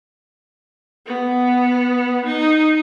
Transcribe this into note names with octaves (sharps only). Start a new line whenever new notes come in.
B3
D#4